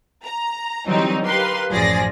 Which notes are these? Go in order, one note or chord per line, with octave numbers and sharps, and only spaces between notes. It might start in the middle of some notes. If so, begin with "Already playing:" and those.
A#5
D3 E3 F#3 G3 C4 D#4
G4 A#4 B4 F5 C6
A1 F#2 F3 G#4 D5 A#6